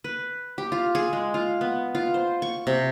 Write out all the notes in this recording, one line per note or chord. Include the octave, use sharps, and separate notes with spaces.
B4
G4
F4
G#4
G#3
F4
B3
F4
C5
C#6
C3